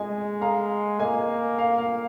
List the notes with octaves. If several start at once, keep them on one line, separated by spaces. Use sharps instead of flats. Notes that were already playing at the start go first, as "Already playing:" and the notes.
Already playing: G#3 D#5 G#5
F5 A#5
A#3 D#5 G#5
F5
F5